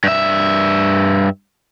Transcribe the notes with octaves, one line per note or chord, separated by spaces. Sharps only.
G2 E5